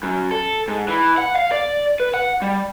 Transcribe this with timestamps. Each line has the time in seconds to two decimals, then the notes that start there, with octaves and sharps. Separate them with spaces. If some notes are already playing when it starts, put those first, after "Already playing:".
0.03 F#2
0.31 A4
0.68 G#2
0.88 E3
1.18 F#5
1.36 F5
1.52 D5
2.00 B4
2.14 F#5
2.42 G3